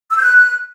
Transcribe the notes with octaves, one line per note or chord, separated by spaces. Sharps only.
E6
G6
F#6